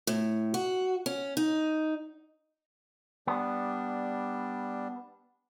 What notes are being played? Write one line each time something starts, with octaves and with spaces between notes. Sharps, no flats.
A2
F#4
C#4
D#4
G3 B3 D4